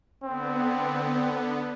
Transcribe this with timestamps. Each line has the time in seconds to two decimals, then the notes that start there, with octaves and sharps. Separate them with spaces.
0.24 D3 B3 C4